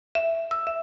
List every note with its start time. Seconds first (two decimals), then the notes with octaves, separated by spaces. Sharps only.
0.15 E5
0.51 E6
0.67 E5